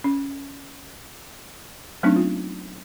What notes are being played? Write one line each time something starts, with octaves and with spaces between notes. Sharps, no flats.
C#4
F#3 A3 B3 C4 D4 D#4
F4